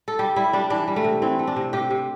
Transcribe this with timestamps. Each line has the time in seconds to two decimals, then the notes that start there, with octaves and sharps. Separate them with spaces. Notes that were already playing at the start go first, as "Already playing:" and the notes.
0.08 A4
0.19 G3 G4
0.36 G3 E4
0.53 G3 D4
0.70 E3 D4
0.88 G3
0.96 A3
1.05 C3
1.22 E3 C4
1.39 A3
1.47 D4
1.56 C3
1.73 C3 G4
1.91 C3